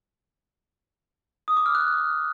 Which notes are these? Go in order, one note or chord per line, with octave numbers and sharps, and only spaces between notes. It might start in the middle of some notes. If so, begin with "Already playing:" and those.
D#6
D6
F6
F#6